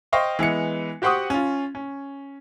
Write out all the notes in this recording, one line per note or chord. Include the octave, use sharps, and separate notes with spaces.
C5 D#5 F5 G5 C#6
E3 G#3 B3 C#7
F#4 G4 C5 F#5 C#6 D#6
C#4 F4
C#4